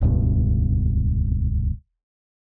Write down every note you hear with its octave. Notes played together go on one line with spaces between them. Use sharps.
D#1 C#2 G2 B2